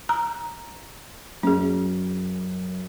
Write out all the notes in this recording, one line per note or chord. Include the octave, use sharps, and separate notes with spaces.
A#5
F#2 C#4 G#4